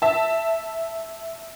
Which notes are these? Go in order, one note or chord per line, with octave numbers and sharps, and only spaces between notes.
E5 A5